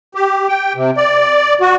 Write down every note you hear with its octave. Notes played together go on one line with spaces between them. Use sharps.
G4
G5
C3
D5
F#4